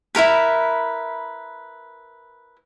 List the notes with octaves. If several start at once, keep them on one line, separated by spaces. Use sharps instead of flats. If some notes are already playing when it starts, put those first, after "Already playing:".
E4 F4 A#4 B4